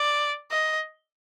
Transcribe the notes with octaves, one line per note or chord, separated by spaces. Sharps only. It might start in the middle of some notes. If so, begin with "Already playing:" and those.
Already playing: D5
D#5